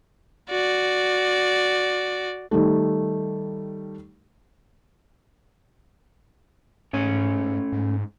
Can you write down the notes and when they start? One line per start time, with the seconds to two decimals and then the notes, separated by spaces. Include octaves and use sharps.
0.50 F#4 D5
2.51 D#3 G3 A3
6.93 G#2 A3 C#4 C#5
7.72 G#2